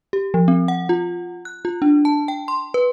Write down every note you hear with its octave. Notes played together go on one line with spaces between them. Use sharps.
G4
F3
C4
F#5
F4
F#6
F4
D4
A5
G5
C6
B4